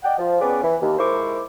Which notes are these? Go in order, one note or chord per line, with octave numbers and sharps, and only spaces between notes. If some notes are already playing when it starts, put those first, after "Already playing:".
D5 D#5 F#5 G5
F3
B3 C#4 G#4 B4 D5
E3
D#2
G#2 E4 A#4 C5 C#6 D6